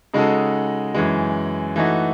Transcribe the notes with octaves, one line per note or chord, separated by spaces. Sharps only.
C#3 G#3 D#4 F#4 A4
F#2 E3 G#3
E3 A3 D#4 F#4